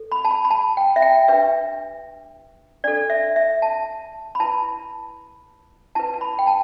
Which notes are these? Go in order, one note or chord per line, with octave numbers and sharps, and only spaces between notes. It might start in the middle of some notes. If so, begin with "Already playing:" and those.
Already playing: A4
B5
A5
B5
B5
A5
G5
E5
G5
D4 G4 B4 E5
D4 A4 D5
E5
E5
A5
B5
E4 B4 A5
E4 B4 A5
A5
B5
G5
A5